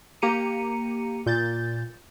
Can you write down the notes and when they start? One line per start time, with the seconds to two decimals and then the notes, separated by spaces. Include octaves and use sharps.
0.22 A#3 G4 A#5 C#7 D#7
1.26 A#2 G6 A6